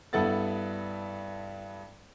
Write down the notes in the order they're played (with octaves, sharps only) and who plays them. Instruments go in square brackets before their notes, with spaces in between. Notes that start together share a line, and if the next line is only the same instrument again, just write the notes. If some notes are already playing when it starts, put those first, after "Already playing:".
[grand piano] G2 B3 E4 A4 F#5 A6